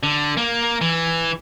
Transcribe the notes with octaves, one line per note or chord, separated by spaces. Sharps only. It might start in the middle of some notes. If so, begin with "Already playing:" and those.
D3
A#3
E3